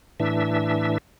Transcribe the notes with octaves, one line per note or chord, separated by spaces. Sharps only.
A2 E3 D4 E5